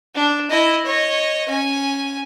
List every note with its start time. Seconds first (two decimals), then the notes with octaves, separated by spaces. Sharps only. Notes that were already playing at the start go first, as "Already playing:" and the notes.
0.15 D4
0.50 E4 D#5
0.85 C#5 D#5
1.48 C#4 G#5